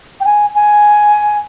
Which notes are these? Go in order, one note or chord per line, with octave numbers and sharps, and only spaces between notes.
G5
G#5
G#5